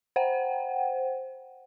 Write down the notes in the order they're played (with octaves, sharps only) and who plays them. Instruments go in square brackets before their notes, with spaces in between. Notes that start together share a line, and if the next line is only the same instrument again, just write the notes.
[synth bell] C5 F#5 G5